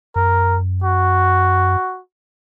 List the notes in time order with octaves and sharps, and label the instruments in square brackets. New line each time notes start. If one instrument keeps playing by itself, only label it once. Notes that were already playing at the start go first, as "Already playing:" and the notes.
[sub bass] F#2 [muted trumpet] A#4
[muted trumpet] F#4